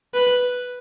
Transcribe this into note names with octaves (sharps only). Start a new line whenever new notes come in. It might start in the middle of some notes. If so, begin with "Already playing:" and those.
B4